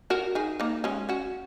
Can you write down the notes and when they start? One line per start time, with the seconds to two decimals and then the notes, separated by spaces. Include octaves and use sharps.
0.10 F#4 A#4
0.35 D#4 G#4
0.60 A#3 D#4
0.84 G#3 C#4
1.09 C#4 F#4